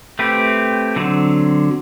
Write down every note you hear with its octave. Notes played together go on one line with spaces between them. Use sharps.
A3 C4 G4 B4
D3 F#3 C4